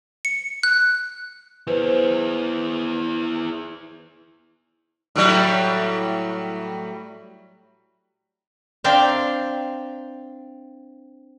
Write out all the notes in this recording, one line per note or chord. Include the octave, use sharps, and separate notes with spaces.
C#7
F#6
E4 G#4 B4 C5
A2 F#3 G3
C4 D4 E5 F5 G5 A#5